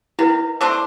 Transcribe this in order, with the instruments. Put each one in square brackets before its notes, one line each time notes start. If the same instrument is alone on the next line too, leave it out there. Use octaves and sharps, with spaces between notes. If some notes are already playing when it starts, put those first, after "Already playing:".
[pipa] D#3 [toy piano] E4 B4
[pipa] A3 D4 C5 [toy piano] E6